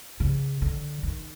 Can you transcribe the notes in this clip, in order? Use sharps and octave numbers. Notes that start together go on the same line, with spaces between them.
C#3
D3
D#3